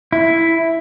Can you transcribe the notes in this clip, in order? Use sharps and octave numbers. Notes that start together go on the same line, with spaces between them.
E4